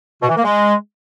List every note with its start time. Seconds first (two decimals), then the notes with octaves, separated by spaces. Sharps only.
0.22 B2
0.29 E3
0.36 A#3
0.44 G#3